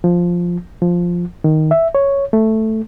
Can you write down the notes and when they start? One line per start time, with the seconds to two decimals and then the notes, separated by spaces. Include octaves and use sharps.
0.04 F3
0.82 F3
1.44 D#3
1.71 E5
1.95 C#5
2.33 A3